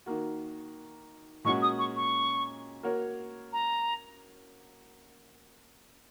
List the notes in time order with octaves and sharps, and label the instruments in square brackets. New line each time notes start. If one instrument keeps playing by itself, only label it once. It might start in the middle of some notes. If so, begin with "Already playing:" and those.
[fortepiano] D#3 A#3 F#4
[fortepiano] A#2 G#3 C#4 F#4 [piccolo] C#6
[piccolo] D#6
C#6
C#6
[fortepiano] A#3 F#4 A#4 C#5
[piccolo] A#5